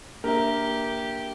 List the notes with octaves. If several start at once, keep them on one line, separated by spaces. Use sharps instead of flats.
A#3 D4 G4 A#4 E5